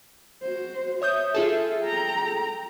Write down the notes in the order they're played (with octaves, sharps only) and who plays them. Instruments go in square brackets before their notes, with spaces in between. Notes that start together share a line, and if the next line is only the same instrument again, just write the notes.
[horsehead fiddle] F#4 C5
[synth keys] C#5 D#6 G6 [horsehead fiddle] E5
[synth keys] F4 G#4 A4
[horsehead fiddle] G5 A#5